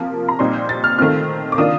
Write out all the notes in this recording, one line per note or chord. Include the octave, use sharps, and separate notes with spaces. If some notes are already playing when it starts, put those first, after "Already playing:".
Already playing: C3 F3 A#3
A#5
A#2 G3 C4 D#4 C6
G6
A6
F6
D#3 A3 C4 F4 F6
D6
D#3 A#3 D4 F4 D#6